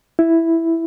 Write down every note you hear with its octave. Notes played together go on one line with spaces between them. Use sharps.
E4